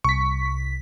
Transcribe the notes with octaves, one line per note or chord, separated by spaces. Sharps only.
C2 C#6 B6